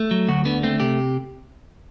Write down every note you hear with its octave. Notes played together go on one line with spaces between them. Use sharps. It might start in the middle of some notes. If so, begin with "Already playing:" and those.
Already playing: A3
F#3
D2 F#4
D3 B3
A3 C4
C3 G4